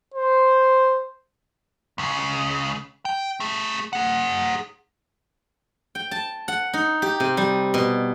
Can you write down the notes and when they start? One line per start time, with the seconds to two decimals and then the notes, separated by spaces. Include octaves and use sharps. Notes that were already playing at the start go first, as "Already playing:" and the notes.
0.14 C5
1.98 C#2 C#3
3.05 G5
3.40 A3 G#4
3.93 G#4 F#5
5.95 G5
6.11 A5
6.48 F#5
6.73 D#4
7.02 G4
7.20 C3
7.37 G3
7.74 B2